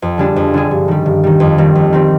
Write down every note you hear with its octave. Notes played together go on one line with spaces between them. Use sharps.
F2
D3 G3 D4 G#4
F2
D3 G3 D4 G#4
G2
D#3 G3
G2
D#3 G3
F2
D#3 G3 C4
F2
D#3 G3 C4